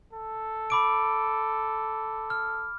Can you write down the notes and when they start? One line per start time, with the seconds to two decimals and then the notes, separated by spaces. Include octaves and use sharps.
0.13 A4
0.70 B5 D6 D7
2.30 F6